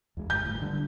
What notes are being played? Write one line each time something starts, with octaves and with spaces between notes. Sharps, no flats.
E2 G#3
G1 G6
G1 A2
D3 G3